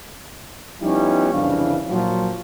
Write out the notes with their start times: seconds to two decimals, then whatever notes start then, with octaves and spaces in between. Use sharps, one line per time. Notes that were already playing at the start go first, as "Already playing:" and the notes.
0.82 F3 G3 B3 C#4 D#4 E4
1.34 C2 F2 C#3 E3 D4 F5
1.91 A#2 F3 F#3